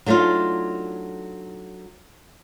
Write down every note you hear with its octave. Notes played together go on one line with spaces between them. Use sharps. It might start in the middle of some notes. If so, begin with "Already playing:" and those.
F#3 A3 D4 D#4 F4